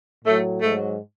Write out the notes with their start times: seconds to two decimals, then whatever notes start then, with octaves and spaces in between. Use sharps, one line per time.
0.24 A2 F#3 A3
0.61 G#2 F#3 A3